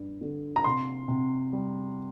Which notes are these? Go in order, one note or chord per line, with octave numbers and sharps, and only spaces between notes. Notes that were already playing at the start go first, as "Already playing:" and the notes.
Already playing: G2
D3
A#5
C3 C6
C3
G3